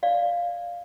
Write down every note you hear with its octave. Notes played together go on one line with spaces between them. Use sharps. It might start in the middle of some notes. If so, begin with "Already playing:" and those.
D5 F5